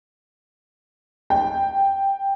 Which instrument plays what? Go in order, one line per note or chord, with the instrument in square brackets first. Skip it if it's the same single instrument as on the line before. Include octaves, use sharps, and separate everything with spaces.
[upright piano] G5